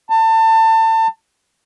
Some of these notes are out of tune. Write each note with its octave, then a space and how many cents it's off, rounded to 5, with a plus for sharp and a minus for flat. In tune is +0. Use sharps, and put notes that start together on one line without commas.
A5 +30